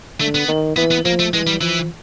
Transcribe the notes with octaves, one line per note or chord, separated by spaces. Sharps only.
D3 A3
B3
D#3
E3 B3
B3
F3 A#3
A3
E3 G#3
G3
E3 F3